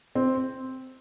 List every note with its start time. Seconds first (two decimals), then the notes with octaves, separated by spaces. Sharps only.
0.15 C4